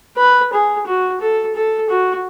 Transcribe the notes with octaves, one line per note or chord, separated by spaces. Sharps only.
B4
G#4
F#4
A4
A4
F#4